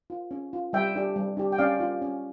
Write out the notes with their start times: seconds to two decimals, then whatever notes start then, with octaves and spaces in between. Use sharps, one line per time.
0.10 F4
0.31 C#4
0.53 F4
0.73 G3 E5 G5
0.95 D4 G4
1.16 G3
1.37 D4 G4
1.52 G5
1.58 C#4 D5 F5
1.80 F4
2.02 C#4